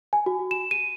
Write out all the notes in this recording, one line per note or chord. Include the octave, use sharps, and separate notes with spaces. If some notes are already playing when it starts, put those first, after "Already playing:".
G#5
F#4
E7
D#7